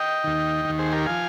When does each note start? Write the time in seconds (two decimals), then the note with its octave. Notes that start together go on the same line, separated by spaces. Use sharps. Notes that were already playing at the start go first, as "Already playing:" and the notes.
Already playing: D#5 G5
0.24 D#2 D#3
0.65 D#2 D#3
0.79 G#4 C5
0.92 G4 A#4
1.06 F3 F5 G#5